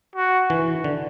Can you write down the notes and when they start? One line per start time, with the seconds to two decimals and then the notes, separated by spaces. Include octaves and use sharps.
0.16 F#4
0.50 E3
0.84 D3